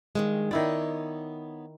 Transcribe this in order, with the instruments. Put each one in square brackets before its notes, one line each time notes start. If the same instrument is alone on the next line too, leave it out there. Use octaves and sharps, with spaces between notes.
[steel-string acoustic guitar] G2 D#3 G#3
[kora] D#3 E4 D5 [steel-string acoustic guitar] B3 D#4 C#5